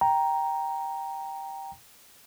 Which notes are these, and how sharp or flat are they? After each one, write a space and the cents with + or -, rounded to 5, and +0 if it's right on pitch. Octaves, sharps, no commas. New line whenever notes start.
G5 +0 A#5 +5